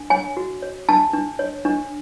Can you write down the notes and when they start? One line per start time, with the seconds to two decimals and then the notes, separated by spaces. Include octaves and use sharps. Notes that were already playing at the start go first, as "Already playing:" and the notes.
Already playing: D4
0.10 C#5 G#5
0.37 F#4
0.62 C#5
0.89 D4 A5
1.14 D4
1.39 C#5
1.65 D4